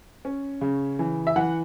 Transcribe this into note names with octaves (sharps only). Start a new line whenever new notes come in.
C#4
C#3
E3
E5
E3 F#5